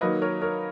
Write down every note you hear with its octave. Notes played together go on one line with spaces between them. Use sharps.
D#3 F#3 A#3 B4 D#5
A#4 C#5
A#4 C#5